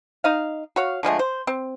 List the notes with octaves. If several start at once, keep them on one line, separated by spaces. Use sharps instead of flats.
D#4 D#5 F5
F#4 C#5 F5
D3 F3 G#3 A3
C5
C4